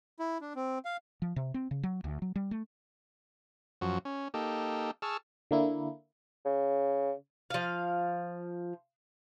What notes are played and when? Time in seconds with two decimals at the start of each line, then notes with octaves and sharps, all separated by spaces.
0.20 E4
0.41 D4
0.55 C4
0.85 F5
1.22 F3
1.36 C3
1.54 C4
1.71 C#3
1.83 F#3
2.04 D2
2.22 F#3
2.36 G3
2.51 A3
3.81 F#2 F3 F#4
4.05 C#4
4.34 A#3 D#4 G4 A4
5.02 G#4 A5 C#6 E6 F6
5.51 D3 A#3 E4
6.45 C#3
7.50 F3 F5